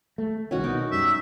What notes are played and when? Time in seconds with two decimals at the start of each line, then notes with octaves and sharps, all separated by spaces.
0.18 A3
0.51 C2 D#3 C#4 F#4
0.64 B2 D#4 A#4
0.92 F#2 G3 E5